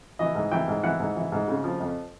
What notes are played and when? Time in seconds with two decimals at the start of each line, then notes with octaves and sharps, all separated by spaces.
0.19 E3 D#5
0.35 G#2
0.51 E3 G5
0.68 G#2
0.83 E3 F#5
1.00 G#2
1.16 E3
1.32 G#2
1.48 C#3
1.64 F3
1.80 F2